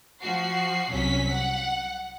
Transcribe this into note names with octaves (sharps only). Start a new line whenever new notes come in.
F3 F#4 C7
C2 F#3 C#4 B6
F#5